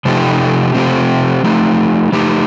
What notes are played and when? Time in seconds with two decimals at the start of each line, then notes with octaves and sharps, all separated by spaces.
0.05 C3 F3 A3 D#4 G4
0.74 C3 F3 A3 C4 G4
1.44 F3 A3 D#4 G4
2.12 F3 A3 D#4 G4